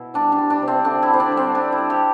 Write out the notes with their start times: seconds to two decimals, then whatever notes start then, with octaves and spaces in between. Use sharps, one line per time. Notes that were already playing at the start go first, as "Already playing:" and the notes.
Already playing: B2 E4
0.14 G3 D4
0.32 D4
0.38 G3
0.50 D4
0.62 C3
0.68 C4
0.85 D3 D4
1.03 E4
1.08 D3
1.14 C4
1.20 D4
1.32 G3
1.37 C4
1.54 G3 D4
1.72 E4
1.78 G3
1.90 G4